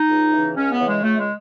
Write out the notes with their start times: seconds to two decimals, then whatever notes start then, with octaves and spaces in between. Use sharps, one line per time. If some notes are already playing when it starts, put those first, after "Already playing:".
Already playing: D#4
0.08 C#2
0.32 C#3 E3
0.55 C#2 C#4
0.71 B3
0.79 C#3 E3
0.88 G#3
1.03 C#2 A3
1.18 G#3